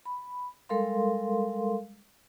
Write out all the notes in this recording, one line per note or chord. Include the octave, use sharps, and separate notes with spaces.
B5
G3 G#3 A4 A#4 F5 C6